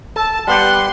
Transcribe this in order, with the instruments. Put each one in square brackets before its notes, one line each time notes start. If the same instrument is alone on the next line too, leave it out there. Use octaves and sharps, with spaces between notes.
[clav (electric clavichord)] A4 [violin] A5
[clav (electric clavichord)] G3 B3 G4 [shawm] F#5 [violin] C6